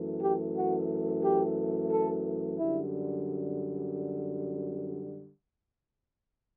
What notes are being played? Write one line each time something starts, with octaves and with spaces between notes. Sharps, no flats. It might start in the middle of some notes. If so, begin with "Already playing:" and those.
Already playing: F#2 E3 A3
G4
F#4
G4
A4
F#2 D3 G3 E4